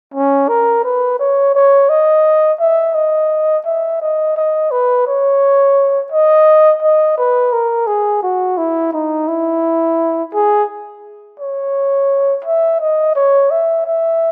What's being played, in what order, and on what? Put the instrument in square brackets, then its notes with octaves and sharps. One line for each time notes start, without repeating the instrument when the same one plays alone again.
[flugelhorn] C#4
A#4
B4
C#5
C#5
D#5
E5
D#5
E5
D#5
D#5
B4
C#5
D#5
D#5
B4
A#4
G#4
F#4
E4
D#4
E4
G#4
C#5
E5
D#5
C#5
E5
E5